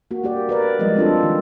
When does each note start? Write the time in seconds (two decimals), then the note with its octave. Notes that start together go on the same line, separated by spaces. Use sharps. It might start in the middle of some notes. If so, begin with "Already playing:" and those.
0.11 A#3 F#4
0.24 A#3 G4 D5
0.49 A#4 B4 D5
0.79 F3 G3 G#3 A#3 D#5
0.96 C4 D4 F4 A4
1.23 D#3